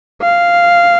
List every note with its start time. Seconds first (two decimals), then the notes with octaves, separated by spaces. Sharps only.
0.22 F5